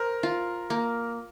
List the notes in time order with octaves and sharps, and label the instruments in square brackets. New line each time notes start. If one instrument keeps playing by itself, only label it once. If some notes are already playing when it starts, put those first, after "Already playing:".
Already playing: [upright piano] A#4 [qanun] C5
[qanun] F4
A#3